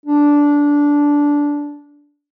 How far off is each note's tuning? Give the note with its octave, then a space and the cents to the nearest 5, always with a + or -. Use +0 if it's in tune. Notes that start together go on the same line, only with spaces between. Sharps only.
D4 -15